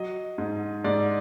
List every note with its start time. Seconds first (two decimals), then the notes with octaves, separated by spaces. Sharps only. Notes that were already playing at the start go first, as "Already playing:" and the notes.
Already playing: F#3 D#5
0.38 G#2
0.84 G#2 D5